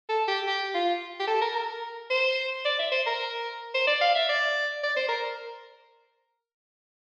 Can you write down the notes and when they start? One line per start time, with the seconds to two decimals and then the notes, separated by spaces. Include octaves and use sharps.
0.09 A4
0.28 G4
0.47 G4
0.74 F4
1.20 G4
1.28 A4
1.41 A#4
1.56 A#4
2.10 C5
2.65 D5
2.79 E5
2.92 C5
3.06 A#4
3.74 C5
3.87 D5
4.01 F5
4.15 E5
4.29 D5
4.83 D5
4.96 C5
5.08 A#4